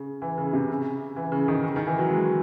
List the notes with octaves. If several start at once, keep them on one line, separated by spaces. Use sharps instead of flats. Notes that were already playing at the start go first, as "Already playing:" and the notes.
Already playing: C#3
E3
C#3
C3
C#3
E3
C#3
D#3
C#3
D#3
E3
F#3
G#3